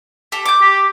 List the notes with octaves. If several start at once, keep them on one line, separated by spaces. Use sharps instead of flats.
G4 A4
D6 G6
G4